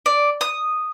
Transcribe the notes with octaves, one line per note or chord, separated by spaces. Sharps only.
D5
D#6